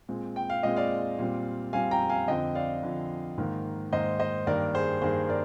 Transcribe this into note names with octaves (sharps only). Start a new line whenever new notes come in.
A#2 G#3 C4
G5
F5
A#2 G#3 C4 D#5
D5 F5
A#2 G3 C4
A#2 G3 C4 F5 G#5
G5 A#5
F5 G#5
F2 D3 F3 C4 D#5 G5
D5 F5
F2 D3 F3 C4
G#2 D#3 A#3
G#2 D#3 A#3 C5 D#5
C5 D#5
G2 D#3 A#3 A#4 D5
G#4 C5
G2 D#3 A#3 G#4 C5
A#4 D5